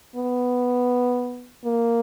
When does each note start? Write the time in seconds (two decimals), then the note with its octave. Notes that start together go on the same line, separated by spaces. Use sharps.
0.16 B3
1.65 A#3